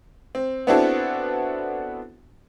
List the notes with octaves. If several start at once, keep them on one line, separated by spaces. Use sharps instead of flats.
C4
B3 C4 D4 E4 F#4 A4